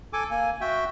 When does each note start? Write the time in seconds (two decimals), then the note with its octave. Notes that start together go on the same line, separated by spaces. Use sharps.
0.13 A4 G#5 D6
0.30 A#3 G#5
0.61 F#4 E5 G5